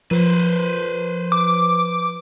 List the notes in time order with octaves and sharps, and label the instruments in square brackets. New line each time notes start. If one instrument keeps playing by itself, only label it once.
[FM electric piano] F3 [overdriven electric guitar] B4 C5
[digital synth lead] D6